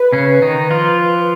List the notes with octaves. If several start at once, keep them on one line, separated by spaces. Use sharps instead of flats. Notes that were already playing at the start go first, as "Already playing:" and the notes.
Already playing: B4
C#3 C#4
D#3 D#4
F3 F4